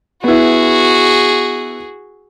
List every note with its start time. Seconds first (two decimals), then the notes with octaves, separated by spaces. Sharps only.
0.24 B3 E4 F#4 G#4